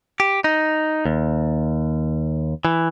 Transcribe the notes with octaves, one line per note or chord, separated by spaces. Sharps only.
G4
D#4
D#2
E3